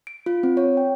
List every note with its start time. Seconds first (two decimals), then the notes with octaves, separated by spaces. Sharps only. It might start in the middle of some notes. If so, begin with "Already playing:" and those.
0.07 D7
0.26 F4
0.43 C4
0.57 C#5
0.77 G5